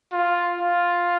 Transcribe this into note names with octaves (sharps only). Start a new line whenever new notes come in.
F4
F4